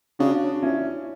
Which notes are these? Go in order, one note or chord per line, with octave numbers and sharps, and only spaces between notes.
C#3 D4 F#4
C#4 E4